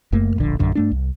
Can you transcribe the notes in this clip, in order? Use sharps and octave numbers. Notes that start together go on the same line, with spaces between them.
F#1 F#2 A3 A#3
D1 A#1 D3
A#1 F#2 D3
G2 A3 D4
C2